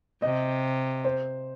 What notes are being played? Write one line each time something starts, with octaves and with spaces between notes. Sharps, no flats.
C3 D#5
C5